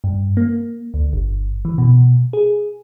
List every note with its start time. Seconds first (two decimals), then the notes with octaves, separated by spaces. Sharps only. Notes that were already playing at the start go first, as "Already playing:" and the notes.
0.04 G2
0.37 A#3
0.94 D2
1.13 G1
1.65 E3
1.78 B2
2.33 G#4